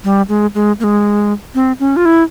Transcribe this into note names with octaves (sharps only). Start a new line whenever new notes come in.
G3
G#3
G#3
A#3
G#3
C4
C#4
F4
E4